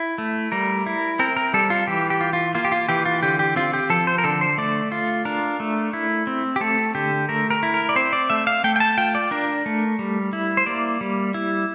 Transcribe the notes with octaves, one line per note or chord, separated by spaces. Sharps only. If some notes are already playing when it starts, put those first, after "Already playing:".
Already playing: E4
A3
G3 A#4
E4
C4 A#4
A#4
G3 A4
F4
E3 G4
G4
F4
F4
A#3 F4
G4
F4
E3 G4
F4
D3 G4
G4
C4 F4
G4
F3 A4
C5
A#4
D3 A4
C5
A3 D5
F4
D4 A#4
A3
E4
C4
G4
A3 A4
D3 G4
A3 A#4
A#4
E4
A#4
D5
C4 C5
D5
A3 E5
F5
A3 G5
G5
A5
F4 G5
D5
D4 A#4
A3
G3
E4
C5
A#3 D5
G3
E4